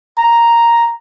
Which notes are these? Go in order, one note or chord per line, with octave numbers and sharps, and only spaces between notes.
A#5